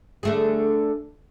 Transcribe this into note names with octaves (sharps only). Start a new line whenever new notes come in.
D3 A3 G#4